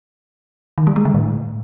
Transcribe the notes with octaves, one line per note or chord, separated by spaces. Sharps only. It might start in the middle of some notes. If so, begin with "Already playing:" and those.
D#3
G3
G#3
D3
A2